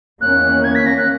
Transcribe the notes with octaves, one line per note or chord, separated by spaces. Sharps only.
E2 D#3 A#3 C#4 F#6
G#6
B6
A#6
F#6